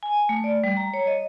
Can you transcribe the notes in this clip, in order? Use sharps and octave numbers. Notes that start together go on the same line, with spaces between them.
G#5
A3
D5
G3
A#5
C#5
D#5